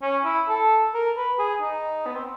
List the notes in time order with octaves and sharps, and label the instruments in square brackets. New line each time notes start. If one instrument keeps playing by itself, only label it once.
[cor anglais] C#4
E4
A4
A#4
B4
G#4
D#4
B3
C4